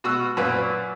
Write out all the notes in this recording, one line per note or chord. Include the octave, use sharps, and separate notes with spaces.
B2 F#4 E6
F#2 A#2 B4